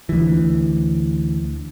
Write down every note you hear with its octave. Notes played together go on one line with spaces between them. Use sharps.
D2 E3